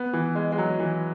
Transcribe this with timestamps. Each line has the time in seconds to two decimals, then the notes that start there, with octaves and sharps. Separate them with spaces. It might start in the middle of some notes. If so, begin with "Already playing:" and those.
Already playing: B3
0.13 E3
0.35 G#3
0.52 G#3
0.58 F#3
0.79 E3